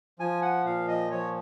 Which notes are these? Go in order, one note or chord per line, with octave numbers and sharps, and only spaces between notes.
F3 G#5
F#5
A#2 F5
D#5
F3 C#5